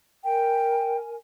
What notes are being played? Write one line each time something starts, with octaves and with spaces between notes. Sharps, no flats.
A#4 G5 G#5